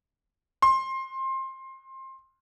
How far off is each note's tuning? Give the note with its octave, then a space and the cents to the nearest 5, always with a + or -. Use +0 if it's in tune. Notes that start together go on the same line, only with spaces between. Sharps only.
C6 +20